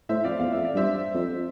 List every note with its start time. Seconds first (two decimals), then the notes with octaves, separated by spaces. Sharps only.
0.09 A2 C5 E5
0.24 F2 D5 F5
0.39 E2 F5
0.52 F2 E5
0.65 D5
0.74 G2
0.77 C5 E5
1.14 F2